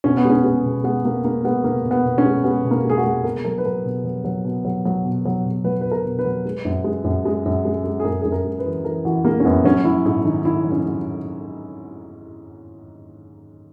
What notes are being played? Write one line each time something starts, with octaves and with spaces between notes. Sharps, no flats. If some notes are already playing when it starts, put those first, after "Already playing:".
B2 C#4
B3
G#3 C#4
G#3 B3
B2
G#3 B3
G#3 A#3
G#3 A#3
G#3 B3
B2 A#3
B2
B3
B2
C#4
G#3
G#3 B3
B2
A#3
G#3 G#4
F#4
G#3
B2 A#4
F#3 A#4
B4
F#3 A#4
B2
F#3
F#3
B2
F#3
F#3
B2
F#3
B2
F#3 B4
B2 B4
A#4
B2
B4
F#3
G#3
F#2
G#3
F#2
G#3
F#2
G#3
G#3
G#4
F#2 A#4
F#2 G#4
A#4
G#3
B4
E3
E3 A#4
E3 F#4
G#3 A#3
C#4
F#2 B3
F#3 C#4
F#3 E4
G#2 E4
D#3 D#4
D#3 E4
F#3
C#4
F#3